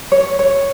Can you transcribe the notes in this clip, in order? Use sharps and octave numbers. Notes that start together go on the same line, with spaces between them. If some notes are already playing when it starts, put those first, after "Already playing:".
C#5
C#5